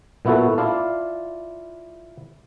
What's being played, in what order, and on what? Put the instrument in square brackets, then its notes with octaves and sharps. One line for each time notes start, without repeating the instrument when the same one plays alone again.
[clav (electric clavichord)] A#2 B3 E4 F#4 A4
E4 F4 D5 F5 A5